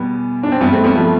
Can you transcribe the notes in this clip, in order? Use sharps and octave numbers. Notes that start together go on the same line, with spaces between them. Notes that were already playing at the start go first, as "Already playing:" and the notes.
Already playing: E2 B2 G3 B3
D4
C4
G2 E3 G3 B3
A3 C4
G3 B3
F3 A3